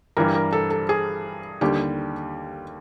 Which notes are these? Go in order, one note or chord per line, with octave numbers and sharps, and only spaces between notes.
G2 E3 G3 A#4
A#4
A4
A4
G#4
D#2 D3 G3 G4